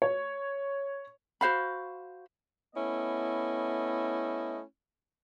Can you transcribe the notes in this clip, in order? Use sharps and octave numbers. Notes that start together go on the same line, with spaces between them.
C#5
F#4 C5 F5 B5
A3 B3 C#4 E4 D#5